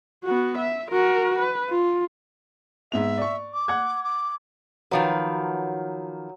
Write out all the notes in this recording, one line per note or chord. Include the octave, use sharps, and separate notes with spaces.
B3 F#4
E5
F#4 A#4
B4
F4
G#2 B3 E5 F7
D5 C#6
D6
F#5 F#6 G#6
D6
D#3 F3 F#3 B4